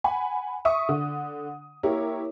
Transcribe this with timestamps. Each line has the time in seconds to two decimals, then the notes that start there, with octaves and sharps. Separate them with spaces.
0.04 F#5 G#5 B5
0.65 E5 C#6 D#6
0.89 D3
1.83 A#3 E4 G4 A#4 C#5